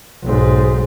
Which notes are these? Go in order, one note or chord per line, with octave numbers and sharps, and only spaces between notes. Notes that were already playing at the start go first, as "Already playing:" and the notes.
B1 G#2